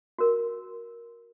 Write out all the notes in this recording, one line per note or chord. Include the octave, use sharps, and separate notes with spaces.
F#4 A#4